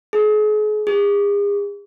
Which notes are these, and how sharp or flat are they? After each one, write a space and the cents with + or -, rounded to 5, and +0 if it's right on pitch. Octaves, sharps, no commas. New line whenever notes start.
G#4 +40
G#4 -40